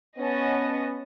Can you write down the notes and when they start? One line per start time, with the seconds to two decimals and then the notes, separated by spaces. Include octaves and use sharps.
0.18 B3 C#4 D#5 A5